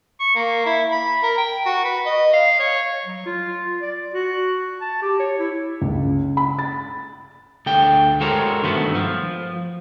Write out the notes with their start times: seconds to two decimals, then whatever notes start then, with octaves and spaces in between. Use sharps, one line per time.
0.20 C#6
0.36 A#3
0.66 E4
0.92 B5
1.23 A#4
1.38 G5
1.66 F#4
1.84 B4
2.06 D#5
2.33 F5
2.60 C#5
3.05 F#3
3.25 F4
3.81 D5
4.14 F#4
4.81 A5
5.02 G4
5.19 C#5
5.39 E4
5.82 C#2
6.37 B5
6.59 A6
7.66 D2 A4 G5
8.21 G#3 F#4 A4 A#4 C5 C#5
8.62 G2 D#3 A3 B3 F#4
8.95 F3